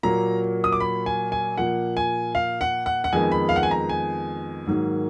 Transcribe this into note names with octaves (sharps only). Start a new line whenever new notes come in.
A#2 F#3 A#3 A#5
D#6
D6
B5
G#5
G#5
A#2 F3 A#3 F#5
G#5
F5
F#5
F#5
F#5
F2 D#3 G#3 B3 G#5
B5
F5
F#5
G#5
A#5
G#5
G#2 D#3 F#3 A#3